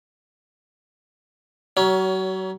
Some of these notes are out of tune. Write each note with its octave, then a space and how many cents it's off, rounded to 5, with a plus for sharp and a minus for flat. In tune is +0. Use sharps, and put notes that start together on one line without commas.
F#3 +35 C#4 +20